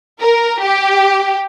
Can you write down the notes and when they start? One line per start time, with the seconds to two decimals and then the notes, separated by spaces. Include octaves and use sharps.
0.21 A#4
0.60 G4